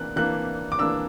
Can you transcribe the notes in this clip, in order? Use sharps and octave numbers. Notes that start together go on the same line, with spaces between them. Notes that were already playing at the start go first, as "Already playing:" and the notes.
Already playing: E3 A#3 D4 F#6
E3 A#3 D4 F#6
D6
E3 A#3 D4 E6